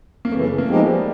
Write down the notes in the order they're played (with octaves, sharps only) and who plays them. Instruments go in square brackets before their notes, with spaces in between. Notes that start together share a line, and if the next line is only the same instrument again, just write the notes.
[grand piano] A#3
[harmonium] F#2 C#3 E3 [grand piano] A3
[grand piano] A#3
[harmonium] F3 G#3 B3 D#4 G4 [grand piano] A3
[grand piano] G3